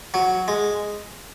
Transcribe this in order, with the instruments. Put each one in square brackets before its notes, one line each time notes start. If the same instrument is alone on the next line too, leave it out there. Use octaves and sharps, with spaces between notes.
[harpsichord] F#3
G#3